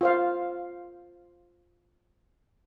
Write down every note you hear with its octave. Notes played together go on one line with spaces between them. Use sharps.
F4 C5 F5